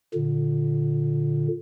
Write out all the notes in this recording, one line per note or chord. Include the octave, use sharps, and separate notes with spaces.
A#2 D3